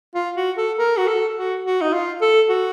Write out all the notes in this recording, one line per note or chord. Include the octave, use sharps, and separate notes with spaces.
F4
F#4
A4
A#4
F#4
A4
F#4
F#4
D#4
F4
A4
F#4